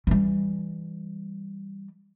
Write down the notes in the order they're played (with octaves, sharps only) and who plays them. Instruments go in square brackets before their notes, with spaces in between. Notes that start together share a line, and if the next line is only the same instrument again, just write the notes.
[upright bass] E3 G3